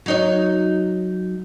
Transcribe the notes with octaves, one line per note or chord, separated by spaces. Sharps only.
F#3 D#4 C#5